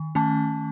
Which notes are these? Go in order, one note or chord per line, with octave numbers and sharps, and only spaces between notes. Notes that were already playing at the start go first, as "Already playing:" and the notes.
Already playing: D#3
D#3 A3 C#4 A5